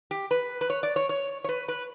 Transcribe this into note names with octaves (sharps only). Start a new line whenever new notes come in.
G4
B4
B4
C#5
D5
C#5
C#5
C#5
B4
B4